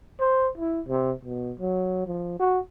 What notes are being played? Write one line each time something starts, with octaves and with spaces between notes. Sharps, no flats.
C5
E4
C3
B2
F#3
F3
F#4